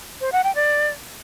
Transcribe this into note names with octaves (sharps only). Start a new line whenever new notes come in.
C5
F#5
G5
D5